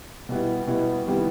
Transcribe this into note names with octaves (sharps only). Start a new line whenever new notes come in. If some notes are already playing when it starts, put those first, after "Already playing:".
B2 G3 B3 E4
B2 G3 B3 E4
C3 D#3 G3 B3 E4